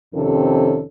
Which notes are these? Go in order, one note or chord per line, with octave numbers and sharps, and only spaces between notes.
F2 C3 D#3 C#4 A4